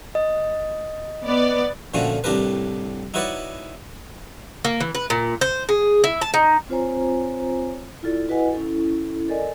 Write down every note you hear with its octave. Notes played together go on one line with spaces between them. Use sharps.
D#5
B3 D5
A#2 D3 F3 A3 C#4 F#4
C2 A2 D4 G4 A#4 B4
D#4 E4 F#4 B4 C#5 D5
A#3
E3
B4
A#2
C5
G#4
E4
A5
D#4
C4 F4 C5 C#5 G#5 A#5
E4 F4 A4 D5
E4 F#4 B4 D#5 F#5 G#5
C#4 E4 A4
A4 A#4 D5 D#5 G#5